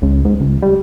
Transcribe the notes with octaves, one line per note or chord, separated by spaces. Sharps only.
C#2
G#2
C#2
G3